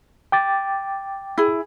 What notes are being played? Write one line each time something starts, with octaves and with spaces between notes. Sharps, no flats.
G5 D6 A6
E4 G#4